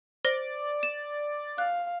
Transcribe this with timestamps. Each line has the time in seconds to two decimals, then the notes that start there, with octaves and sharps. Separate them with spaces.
0.25 C5 D5 A#6
0.83 E7
1.58 F5 F#6